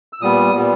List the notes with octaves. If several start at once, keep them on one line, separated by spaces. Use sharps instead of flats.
E6
A#2 G3 B3 D#6
A#2 G3 B3